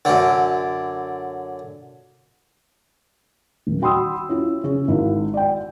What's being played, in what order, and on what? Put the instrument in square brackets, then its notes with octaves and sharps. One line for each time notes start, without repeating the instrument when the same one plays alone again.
[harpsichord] F#2 D3
[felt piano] D#1
F#4 G5 B5 C6 D#6 E6
C#4 E4 F4
C#3 C#4 G#4
G#1 E4 F#4
D5 G5